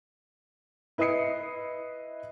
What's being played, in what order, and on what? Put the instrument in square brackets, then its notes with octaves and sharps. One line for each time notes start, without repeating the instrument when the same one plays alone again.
[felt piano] E4 B4 D#5 D#6 C7 C#7